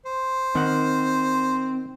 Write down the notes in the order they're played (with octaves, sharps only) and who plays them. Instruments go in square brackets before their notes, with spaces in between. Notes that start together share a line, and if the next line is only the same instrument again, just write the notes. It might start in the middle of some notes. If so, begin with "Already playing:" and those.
[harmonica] C5
[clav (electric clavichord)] D#3 F#5 [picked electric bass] C4